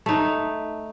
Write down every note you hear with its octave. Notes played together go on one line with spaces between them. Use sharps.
A3 D#4